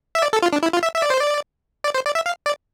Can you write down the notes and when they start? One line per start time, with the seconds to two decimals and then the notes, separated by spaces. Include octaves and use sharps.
0.15 E5
0.22 D5
0.33 A4
0.42 F4
0.53 D4
0.63 E4
0.73 F4
0.83 E5
0.94 E5
1.02 D5
1.10 C5
1.20 D5
1.84 D5
1.94 C5
2.06 D5
2.15 E5
2.26 F5
2.46 D5